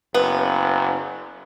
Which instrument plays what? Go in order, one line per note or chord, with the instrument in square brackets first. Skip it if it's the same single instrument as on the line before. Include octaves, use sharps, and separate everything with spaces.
[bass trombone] F#1 [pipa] B3